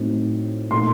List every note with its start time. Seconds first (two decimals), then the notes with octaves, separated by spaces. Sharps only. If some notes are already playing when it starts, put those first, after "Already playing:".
Already playing: A2 F#3 C4 D#4
0.71 A#2 A3 D#4 C6